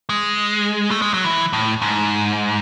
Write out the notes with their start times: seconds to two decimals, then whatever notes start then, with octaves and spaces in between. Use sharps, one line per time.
0.09 G#3
0.91 A3
1.02 G#3
1.14 F#3
1.24 E3
1.53 A2
1.82 G#2